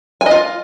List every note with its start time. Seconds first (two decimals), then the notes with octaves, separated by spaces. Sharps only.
0.21 G#5
0.26 D#5
0.31 F4